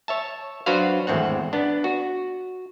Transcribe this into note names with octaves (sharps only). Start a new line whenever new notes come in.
C#5 E5 A5
F#3 D4 F#4 B4 C5 F5
G#1 E2 A2 C4 F#5
B3 D4
F#4